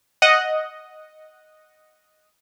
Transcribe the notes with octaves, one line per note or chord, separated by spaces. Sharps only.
D#5 F#5